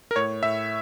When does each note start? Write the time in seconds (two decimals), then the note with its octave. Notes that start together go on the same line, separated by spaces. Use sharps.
0.11 A#4
0.16 A2 C#5
0.43 A2 E5